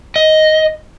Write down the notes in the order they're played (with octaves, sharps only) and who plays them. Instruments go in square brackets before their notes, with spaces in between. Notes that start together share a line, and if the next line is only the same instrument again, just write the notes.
[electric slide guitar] D#5